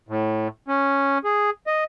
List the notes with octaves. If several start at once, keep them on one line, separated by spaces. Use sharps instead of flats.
A2
C#4
G#4
D#5